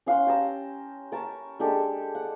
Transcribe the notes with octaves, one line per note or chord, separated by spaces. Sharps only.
C#4 F5 F#5 C6
G4 A5 A#5 E6
A#4 A5 B5 C#6
G#3 D4 G4 A4
F#5